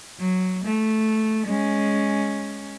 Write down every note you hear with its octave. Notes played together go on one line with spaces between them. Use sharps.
F#3
A3
G#3 C#4